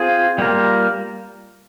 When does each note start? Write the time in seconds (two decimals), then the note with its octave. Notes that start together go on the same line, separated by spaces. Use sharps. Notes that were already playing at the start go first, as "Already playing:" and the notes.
Already playing: C4 F4 G#4
0.38 G3 A#3 F4 A#4